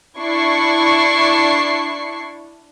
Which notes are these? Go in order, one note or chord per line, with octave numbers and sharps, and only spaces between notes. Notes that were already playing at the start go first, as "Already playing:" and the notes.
D4 E4 C#6 C7